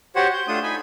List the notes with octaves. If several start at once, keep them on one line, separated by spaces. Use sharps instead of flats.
F#4 G4 C5 C#5 F#5
G6
A3 D4 F4 D#6
D#4 G#5 B5